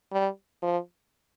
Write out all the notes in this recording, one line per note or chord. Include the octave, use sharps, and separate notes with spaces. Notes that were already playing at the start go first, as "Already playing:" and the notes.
G3
F3